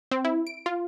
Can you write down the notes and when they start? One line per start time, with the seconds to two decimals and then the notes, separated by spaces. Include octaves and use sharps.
0.11 C4
0.25 E4
0.47 D7
0.66 F4